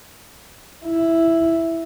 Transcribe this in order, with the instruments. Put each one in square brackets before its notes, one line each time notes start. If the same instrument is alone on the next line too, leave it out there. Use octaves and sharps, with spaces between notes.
[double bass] E4